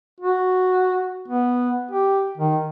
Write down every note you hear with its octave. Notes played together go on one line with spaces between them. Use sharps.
F#4
B3
G4
D#3